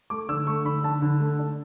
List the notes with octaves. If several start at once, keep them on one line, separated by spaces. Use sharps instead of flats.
A3 D6
D3 E6
A3 C#6
D3 B5
D3 A5
D3
A3
D4